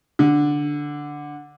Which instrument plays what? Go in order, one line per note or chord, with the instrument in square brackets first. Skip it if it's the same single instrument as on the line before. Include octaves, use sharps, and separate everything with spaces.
[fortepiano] D3